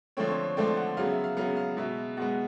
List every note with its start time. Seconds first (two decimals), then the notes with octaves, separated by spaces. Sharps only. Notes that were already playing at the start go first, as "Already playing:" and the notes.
0.17 D3 F3 A3 C4 C#5
0.30 C#5
0.43 C#5
0.57 D3 F3 A3 C4 D5
0.77 F#5
0.97 C#3 F#3 B3 F5
1.10 E5
1.24 F5
1.37 C#3 F#3 B3 F5
1.57 F5
1.77 B2 G#3 B3 E5
2.17 B2 G#3 B3 F#5